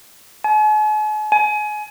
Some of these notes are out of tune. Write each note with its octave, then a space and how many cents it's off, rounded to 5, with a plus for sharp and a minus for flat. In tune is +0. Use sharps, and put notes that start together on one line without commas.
G#5 +45
G#5 +25